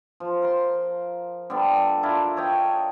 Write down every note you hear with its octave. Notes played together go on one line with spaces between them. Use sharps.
F3
A#4 C6
D3 G3 B3
D4 E4 F4 A#4
A4 C#5 D#5 G5